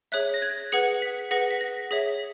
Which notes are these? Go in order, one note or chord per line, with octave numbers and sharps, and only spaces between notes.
G#4 C#5 E5 F#6
A#6
G#6
G#4 B4 F#5 C#7
B6
G#4 B4 F#5 A#6
B6
A#6
G#4 C#5 E5 B6